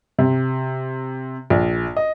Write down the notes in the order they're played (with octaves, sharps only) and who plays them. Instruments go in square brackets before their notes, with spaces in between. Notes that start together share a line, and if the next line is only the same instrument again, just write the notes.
[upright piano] C3
A#1
D#5